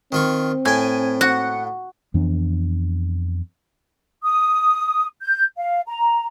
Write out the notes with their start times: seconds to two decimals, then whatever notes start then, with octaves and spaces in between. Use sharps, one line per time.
0.12 D#3 C4 F4 C#6
0.65 A2 G5 G#5
1.21 F#4 F#5
2.14 F2 E3 B3 D4
4.24 D#6
5.22 G6
5.57 F5
5.87 A#5